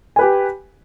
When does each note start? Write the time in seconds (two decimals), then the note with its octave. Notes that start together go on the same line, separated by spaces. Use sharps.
0.16 G#5
0.19 B4
0.21 G4